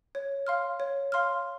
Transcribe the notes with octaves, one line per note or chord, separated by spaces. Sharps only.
C#5
F5 C6 F6
C#5
F5 C6 F6